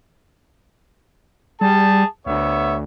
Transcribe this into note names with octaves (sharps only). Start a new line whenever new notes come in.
G3 G#4 A5
D2 B3 C#5 E5